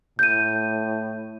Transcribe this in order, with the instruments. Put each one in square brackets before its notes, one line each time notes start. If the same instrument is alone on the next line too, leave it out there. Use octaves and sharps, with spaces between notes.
[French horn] A2 [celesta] G6 D#7